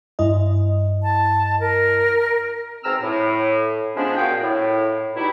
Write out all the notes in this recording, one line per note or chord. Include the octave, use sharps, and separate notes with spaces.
G2 E4 D#5
A5
A#4
G#2 B2 C4 A#5 E6 F6
A2
F3 G#3 B3 C#4 D4
A#2 F#4 G#4 F5 G5
A2
B2 G3 D#4 E4